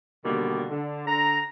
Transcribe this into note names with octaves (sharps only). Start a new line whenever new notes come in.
B2 D3 D#3 G3 A#3
D3
D3 A#5